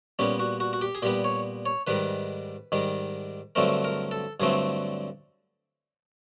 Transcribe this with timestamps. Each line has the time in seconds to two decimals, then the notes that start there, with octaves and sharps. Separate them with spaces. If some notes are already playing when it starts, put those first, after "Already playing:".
0.19 A#2 G3 B3 C#4
0.39 F#4
0.60 F#4
0.73 F#4
0.82 G4
0.95 G#4
1.02 A#2 G3 B3 G4
1.24 C#5
1.66 C#5
1.87 G#2 D#3 G3 B4
2.72 G#2 D#3 G3
3.55 G2 D3 F#3 A3 C4 A#4
3.84 A#4
4.11 A4
4.40 G2 D3 F#3 A3 C4 G#4